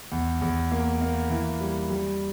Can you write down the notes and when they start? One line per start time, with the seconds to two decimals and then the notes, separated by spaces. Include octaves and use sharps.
0.12 E2
0.42 E2
0.71 A#3
1.02 A#3
1.30 E3
1.61 G3
1.90 G3